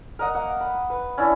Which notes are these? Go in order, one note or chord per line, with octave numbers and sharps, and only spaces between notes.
A#4 D#5 F#5
A#3 F#5
B5
B4
C#4 D4 E4